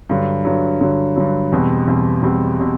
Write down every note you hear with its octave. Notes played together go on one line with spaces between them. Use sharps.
G2 D3 F#3
G2 D3 F#3
G2 D3 F#3
G2 D3 F#3
E2 B2 G3 C4
E2 B2 G3 C4
E2 B2 G3 C4
B2 G3 C4